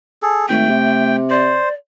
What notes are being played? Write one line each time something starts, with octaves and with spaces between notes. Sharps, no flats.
G#4 A4
G#1 A3 G5
C3
C5 D5